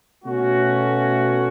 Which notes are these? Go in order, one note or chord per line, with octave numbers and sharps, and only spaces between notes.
B2 A3 C#4 F#4